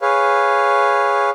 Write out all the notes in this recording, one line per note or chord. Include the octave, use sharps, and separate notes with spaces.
G#4 B4 C#5 F5